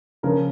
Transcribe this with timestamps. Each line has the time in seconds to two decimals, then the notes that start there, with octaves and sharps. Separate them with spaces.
0.23 C#3 F3 A#3 A#4